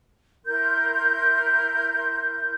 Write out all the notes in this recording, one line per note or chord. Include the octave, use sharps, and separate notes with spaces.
E4 A#4 C6 G6